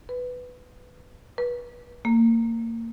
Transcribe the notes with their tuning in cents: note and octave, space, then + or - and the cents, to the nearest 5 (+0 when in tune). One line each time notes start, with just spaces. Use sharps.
B4 +10
B4 -25
A#3 -30